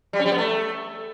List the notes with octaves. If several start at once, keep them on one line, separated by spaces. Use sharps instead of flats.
G3
C#4
G3
B3
A3